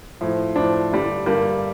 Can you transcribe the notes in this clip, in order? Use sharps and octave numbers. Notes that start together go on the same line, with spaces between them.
A2 F3
A2 F3 D4
G2 D3 G3
G2 D3 G3 A#3